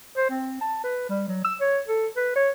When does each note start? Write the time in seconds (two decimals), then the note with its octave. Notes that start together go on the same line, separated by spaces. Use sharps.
0.17 C5
0.30 C4
0.61 A5
0.84 B4
1.09 G3
1.28 F#3
1.44 E6
1.61 C#5
1.88 A4
2.16 B4
2.36 C#5